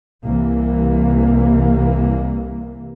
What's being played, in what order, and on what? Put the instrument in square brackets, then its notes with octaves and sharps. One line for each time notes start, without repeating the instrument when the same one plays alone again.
[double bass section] C2 E3 A#3